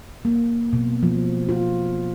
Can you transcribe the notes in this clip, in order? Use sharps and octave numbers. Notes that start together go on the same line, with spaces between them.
A#3
B2
F3
F4